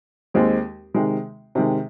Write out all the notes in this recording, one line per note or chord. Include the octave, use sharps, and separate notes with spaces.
D#2 D#3 G#3 C4
C3 D#3 G#3
C3 D#3 G#3